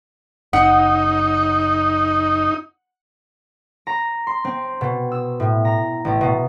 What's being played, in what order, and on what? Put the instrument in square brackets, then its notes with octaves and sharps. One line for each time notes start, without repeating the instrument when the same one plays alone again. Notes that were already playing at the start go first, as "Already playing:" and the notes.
[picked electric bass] F#1 [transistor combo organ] D#4 [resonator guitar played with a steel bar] F#5
[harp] A#5
C6
C4
B2
E6
A2
A#5
A1
B2